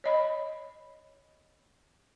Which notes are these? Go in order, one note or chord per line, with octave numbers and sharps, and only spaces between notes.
C#5 D#5 B5